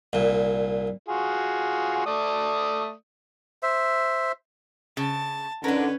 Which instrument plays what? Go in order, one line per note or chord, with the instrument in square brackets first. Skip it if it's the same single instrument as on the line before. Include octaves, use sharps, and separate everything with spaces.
[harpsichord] C2 A#2
[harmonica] F4 F#4 G#4
A3 D5 D#6
[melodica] C5 E5
[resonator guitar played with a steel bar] C#3 [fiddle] A5
[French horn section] D3 D#3 [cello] C#4 [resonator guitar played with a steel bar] D4 A#4 [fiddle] B4